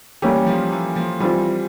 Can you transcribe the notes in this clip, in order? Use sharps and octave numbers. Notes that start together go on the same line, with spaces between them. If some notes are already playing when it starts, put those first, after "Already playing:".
E3 G3 A#3 C#4 G4
F3
E3
F3
E3 G3 C4 F4